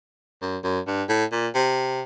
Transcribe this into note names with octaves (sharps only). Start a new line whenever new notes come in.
F#2
F#2
G2
A2
A#2
C3